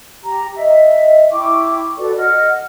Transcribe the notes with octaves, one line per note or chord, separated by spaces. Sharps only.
G4 A#5
D#5 E5
E4 G5 C#6 D6
F#4 A4 B4 D5
D#5 F#5 F6